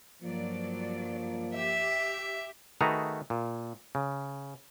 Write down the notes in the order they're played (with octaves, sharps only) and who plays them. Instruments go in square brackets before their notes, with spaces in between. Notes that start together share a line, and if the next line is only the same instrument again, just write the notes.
[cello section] G2 F#3 D5 [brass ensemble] F3 A#3
[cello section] G4 [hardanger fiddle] E5
[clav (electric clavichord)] D#3 A3 F#4 G#4 B4 A#5
A#2
C#3